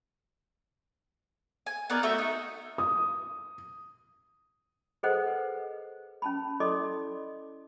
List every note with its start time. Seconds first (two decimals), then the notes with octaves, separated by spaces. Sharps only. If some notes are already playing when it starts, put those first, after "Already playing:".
1.66 G#5
1.90 B3 D#4 A#4 D5
2.03 A3 F#4 E5 G6
2.18 D#4
2.78 D#6
5.03 G#4 A4 B4 C5 D#5 F#5
6.22 C#4 A5 B5
6.60 E4 A4 D5 D#5 C6 D6